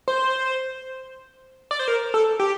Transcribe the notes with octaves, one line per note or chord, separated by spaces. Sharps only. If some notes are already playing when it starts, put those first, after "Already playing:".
C5
D5
C5
A#4
A4
G4